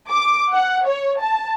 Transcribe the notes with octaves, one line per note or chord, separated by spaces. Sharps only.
D6
F#5
C#5
A5